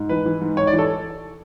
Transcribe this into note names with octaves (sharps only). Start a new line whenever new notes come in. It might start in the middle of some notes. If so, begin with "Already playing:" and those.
Already playing: G#2
E3 B4
E3
G#2
G#2 C#5
D5
E3
A4